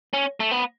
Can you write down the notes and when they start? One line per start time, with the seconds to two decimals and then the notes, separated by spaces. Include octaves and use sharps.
0.13 C#4
0.40 A3
0.51 B3